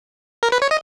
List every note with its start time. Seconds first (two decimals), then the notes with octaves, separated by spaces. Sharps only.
0.43 A#4
0.52 B4
0.62 C#5
0.71 D#5